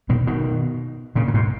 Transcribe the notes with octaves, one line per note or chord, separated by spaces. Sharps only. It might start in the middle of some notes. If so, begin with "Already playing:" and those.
B2 D#3
B2 D#3
A#2 C#3
A#2
G#2 B2